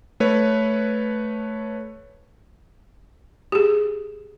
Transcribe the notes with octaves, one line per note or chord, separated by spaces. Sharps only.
A3 B4 C#5
G4 G#4